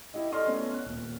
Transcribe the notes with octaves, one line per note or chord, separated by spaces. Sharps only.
E4 G4 D#5
A4 D5 D#5 C6 F6
A3 B3 C#4
F#6
D#1